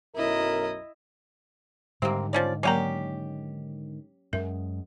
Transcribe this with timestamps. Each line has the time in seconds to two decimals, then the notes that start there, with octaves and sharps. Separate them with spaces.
0.16 B1 F#2 E4 A#4 D#5
2.02 G#2 D3 D#3 G3 A#3 C4 G4 A#5
2.33 F3 C#4 D5
2.63 F#3 A#3 C#4 G4 A#4 A#5
4.33 F#2 G#3 A#4 E5